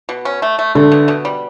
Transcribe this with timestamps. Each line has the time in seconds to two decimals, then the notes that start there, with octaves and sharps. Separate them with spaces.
0.09 B2
0.25 C#4
0.42 A3
0.59 A3
0.75 D3 A3
0.92 B2
1.08 B2
1.25 G3